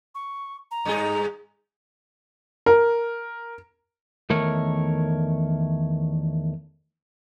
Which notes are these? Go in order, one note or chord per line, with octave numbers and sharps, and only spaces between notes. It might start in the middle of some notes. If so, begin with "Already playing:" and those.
C#6
A#5
G2 D#4 G#4
A#4
E2 D#3 A3 A#4 C#5